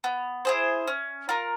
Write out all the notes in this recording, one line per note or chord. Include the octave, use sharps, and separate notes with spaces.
B3
E4 G#4 C5
C#4
F4 A#4